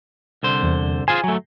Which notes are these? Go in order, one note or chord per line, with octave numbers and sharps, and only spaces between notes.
C2 D3 C5
E2
F4 G#4 C5 G#5
F#3 A3